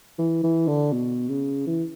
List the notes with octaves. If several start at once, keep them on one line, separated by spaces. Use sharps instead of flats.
E3
E3
D3
B2
C#3
E3